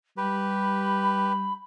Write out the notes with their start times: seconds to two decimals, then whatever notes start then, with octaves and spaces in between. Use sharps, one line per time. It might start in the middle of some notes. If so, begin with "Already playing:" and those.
0.17 G3 G4 B4 B5